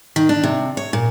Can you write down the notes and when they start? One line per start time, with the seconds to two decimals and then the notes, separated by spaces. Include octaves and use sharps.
0.16 D#3
0.29 D4
0.43 C3
0.77 C#5
0.93 A#2